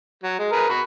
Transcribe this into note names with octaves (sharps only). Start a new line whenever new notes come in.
F#3
G#3
G#4 A#4 B4
F#4 B5